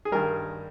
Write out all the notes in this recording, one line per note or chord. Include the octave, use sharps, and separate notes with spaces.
G#4
G2 D#3 G3 A#4